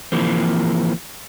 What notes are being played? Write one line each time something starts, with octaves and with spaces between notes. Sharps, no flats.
E3 F3 A#3 C4